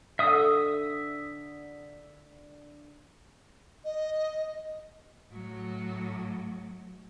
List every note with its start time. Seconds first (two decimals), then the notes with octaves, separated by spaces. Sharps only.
0.19 D3 E5 D#6
3.85 D#5
5.32 A2 F#3